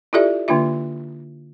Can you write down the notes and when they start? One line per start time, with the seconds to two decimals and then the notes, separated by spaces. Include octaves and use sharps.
0.13 E4 F4 G4 A4 D5 E5
0.48 D3 A#3 D4 F4 E5